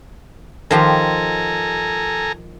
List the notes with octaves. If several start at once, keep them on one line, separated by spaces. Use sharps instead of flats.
D#3 F3 G4 A4 G#5 A#5